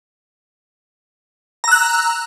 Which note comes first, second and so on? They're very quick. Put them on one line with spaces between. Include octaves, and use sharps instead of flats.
A#5 E6 F#6